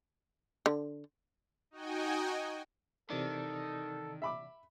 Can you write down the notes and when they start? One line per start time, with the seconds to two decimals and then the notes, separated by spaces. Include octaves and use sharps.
0.66 D3
1.71 D#4 F#4 D#5 G5 G#5
3.10 C3 D#3 E3 A4 D5
4.22 E5 B5 D6